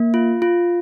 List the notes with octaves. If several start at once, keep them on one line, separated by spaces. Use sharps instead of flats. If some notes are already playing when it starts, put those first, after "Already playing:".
Already playing: A#3
F4
F4